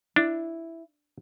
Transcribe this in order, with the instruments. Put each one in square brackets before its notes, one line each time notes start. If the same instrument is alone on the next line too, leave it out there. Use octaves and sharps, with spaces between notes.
[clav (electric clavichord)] D4 [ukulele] E4